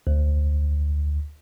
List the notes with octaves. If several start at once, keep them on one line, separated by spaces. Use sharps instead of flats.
D2